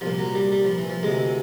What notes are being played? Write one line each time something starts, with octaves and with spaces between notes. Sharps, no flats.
C2 A#2 F3
F#3
G3
G3
F3
E3
F3
D2 C3 E3 G#3